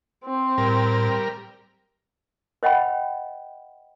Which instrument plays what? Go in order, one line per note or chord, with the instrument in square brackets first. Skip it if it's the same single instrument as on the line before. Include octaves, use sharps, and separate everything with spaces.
[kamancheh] C4
[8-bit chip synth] A2 [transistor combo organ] G3 A#4
[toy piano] C5 D#5 F#5 G5 B5